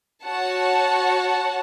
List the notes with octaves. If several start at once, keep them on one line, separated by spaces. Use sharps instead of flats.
F#4 C#5 F#5 A5